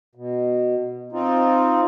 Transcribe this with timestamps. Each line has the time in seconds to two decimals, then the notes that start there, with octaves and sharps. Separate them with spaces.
0.15 B2
1.12 C4 D#4 F4